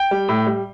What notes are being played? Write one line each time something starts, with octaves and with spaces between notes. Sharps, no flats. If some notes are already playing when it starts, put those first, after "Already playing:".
Already playing: G5
G3
A2
G3